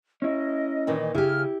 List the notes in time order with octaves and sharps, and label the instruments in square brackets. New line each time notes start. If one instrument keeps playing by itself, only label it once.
[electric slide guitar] C#4 E4 [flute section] D#5
[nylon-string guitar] A#2 D#3 E3
[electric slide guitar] C#3 G#4 [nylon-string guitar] E4 G4 [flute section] F6